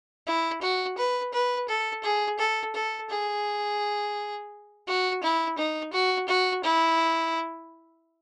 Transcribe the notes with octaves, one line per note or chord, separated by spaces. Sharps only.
E4
F#4
B4
B4
A4
G#4
A4
A4
G#4
F#4
E4
D#4
F#4
F#4
E4